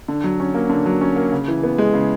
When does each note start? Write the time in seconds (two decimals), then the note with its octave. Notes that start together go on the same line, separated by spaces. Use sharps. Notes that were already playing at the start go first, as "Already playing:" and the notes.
0.08 D3
0.24 F#3
0.40 C#4
0.54 A#3
0.70 D3
0.86 F#3
1.01 C#4
1.16 A#3
1.32 C#3
1.48 E3
1.64 B3
1.78 G#3
1.94 C#3